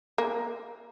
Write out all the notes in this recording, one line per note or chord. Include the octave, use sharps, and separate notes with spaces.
A#3